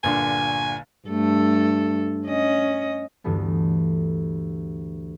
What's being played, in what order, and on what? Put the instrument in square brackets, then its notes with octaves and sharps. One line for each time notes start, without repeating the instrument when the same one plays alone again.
[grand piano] G1 A#2 D3 [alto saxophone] G#5
[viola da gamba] G2 A3 A4
C#4 D#5
[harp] D2 G2 E3 A3 B3